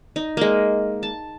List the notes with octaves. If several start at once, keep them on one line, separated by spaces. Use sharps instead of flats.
D#4
G#3 A#3
A5